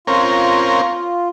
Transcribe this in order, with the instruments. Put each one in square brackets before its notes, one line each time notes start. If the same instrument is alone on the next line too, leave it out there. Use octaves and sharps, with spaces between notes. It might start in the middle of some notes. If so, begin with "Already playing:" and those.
[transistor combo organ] C4 C#4 A#4 [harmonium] F4